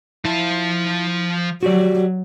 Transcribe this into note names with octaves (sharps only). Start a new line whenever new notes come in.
F3 E4 A5
F#3 F#4 G4 D5